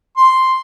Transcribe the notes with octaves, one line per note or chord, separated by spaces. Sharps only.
C6